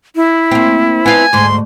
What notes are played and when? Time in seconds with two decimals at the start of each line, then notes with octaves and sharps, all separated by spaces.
0.16 E4
0.51 A#3 C4
1.06 B3 F4 G#5
1.33 D2 G#2 C6